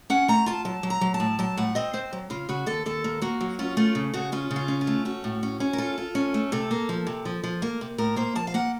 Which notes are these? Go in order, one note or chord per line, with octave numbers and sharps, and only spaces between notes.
C#4 F#5
A3 A#5
F4 A5
F#3 A5
F#3
A#5
F#3
A5
A2
F#3 A5
A2 F#5
C4 D#5
C4 C5
F#3
C#3 F4
C#3 F#4
D#2 A4
D#2 A4
A#3
A#3 F#4
F#3
C#4 F4
A3 F4
C#3
C#3 F#4
C#4 F4
C#3
F4
C#4
F4
A3
C#4 F#4
A2
C#4
C#4
A#4
F4 A4
F4
C#4
A3
C3 A4
A#3
F3
C3
F3
F3
A#3
C3
A2 A#4
A#3 C5
F3 A5
F5
A#3 F#5